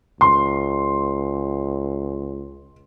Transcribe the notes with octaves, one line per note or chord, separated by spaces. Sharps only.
C#2 C6